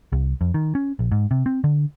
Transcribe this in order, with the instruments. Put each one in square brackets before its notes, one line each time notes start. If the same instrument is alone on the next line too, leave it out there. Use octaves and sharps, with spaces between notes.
[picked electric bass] C2
F2
D#3
C#4
A#1
G#2
C3
C4
D3